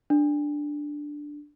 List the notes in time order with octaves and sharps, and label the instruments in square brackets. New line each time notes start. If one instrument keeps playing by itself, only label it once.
[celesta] D4